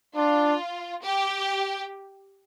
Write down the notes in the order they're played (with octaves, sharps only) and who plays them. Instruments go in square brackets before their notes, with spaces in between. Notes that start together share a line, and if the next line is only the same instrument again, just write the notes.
[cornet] D4 [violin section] F4
[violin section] G4